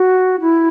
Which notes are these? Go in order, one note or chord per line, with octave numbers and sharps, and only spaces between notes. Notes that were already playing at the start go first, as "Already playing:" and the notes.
Already playing: F#4
E4